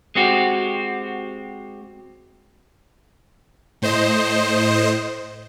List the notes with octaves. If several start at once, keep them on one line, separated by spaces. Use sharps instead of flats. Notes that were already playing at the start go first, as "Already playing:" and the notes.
G#3 C4 F#4 G4
A2 C5 D#5